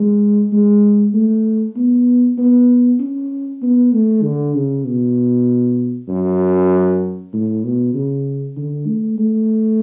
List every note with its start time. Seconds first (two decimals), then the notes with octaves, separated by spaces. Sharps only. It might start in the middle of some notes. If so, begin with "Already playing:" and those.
Already playing: G#3
0.53 G#3
1.14 A3
1.76 B3
2.38 B3
3.00 C#4
3.62 B3
3.93 A3
4.23 D3
4.55 C#3
4.85 B2
6.08 F#2
7.33 A2
7.64 B2
7.94 C#3
8.57 D3
8.87 A3
9.18 A3